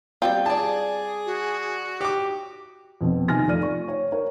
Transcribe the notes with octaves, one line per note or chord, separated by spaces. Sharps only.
G3 C4 F4 G5
G#4 D5 A5
F#4
G4 D6
F2 B2 C4
C3 D#3 G#5 F6 A#6
F2 A3 F4 D5 F6 D#7
C#6
C#5
A#4 C#5